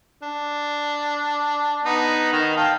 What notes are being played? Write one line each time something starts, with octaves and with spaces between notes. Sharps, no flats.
D4
B3 D#4
D#3 D#4
F5 G5 A5